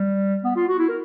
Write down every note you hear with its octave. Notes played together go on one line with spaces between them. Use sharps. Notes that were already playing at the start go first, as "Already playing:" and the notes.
Already playing: G3
B3
F4
F#4
E4
A#4